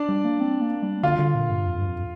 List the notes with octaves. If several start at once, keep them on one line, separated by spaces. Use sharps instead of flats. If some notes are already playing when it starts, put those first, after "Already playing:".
Already playing: D4 D5
G3
A#3
C4
A#3
G3
D3 F4 F5
D3
A#2
G2
F2
G2
F2